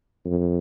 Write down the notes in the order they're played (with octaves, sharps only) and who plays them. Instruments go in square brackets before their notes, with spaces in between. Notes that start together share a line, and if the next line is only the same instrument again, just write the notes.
[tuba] F2